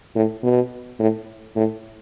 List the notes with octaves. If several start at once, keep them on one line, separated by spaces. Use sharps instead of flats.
A2
B2
A2
A2